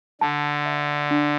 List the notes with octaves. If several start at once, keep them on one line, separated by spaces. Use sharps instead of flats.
D3 A5
E5
D4